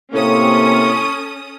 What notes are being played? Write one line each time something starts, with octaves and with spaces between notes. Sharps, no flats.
A2 C3 A#3 C#4 A4 C#6 D#6